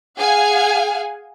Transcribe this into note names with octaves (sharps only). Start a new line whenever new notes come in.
G#4 F5 F#5 G#5